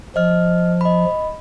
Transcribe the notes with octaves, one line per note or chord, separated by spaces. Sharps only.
F3 D#5 F6
D#5 B5